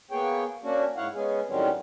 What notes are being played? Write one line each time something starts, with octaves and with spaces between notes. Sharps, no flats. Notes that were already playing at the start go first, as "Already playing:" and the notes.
A#3 B3 G#4 C#5 G5
A#3 C#4 D4 F#4
G#2 E4 C#5 F5 F#5
G#3 B3 C#4 G#4
A2 D#3 F#3 G3 C4 C#4